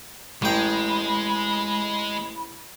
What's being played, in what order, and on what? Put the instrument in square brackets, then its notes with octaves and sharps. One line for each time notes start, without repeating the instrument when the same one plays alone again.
[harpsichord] A1 G5 [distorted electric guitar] G#3 [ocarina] B5